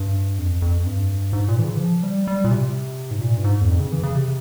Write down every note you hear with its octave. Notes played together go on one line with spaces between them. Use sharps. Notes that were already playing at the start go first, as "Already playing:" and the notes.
Already playing: G2
F2
F2
G2
G#2
A#2
E3
C#3
E3
F3
G3
G3
A#2
C3
G#2
A#2
G2
G#2
E2
F2
C#3
E3
C#3
C3